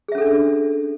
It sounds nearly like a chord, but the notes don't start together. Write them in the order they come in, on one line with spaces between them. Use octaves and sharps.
G#4 E5 C#4 A4 D4